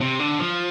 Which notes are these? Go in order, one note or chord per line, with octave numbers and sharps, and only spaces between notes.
C3
D3
F3